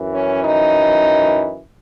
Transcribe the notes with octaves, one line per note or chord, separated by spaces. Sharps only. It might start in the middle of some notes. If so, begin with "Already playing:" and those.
Already playing: F#2 E3
C#4
D#4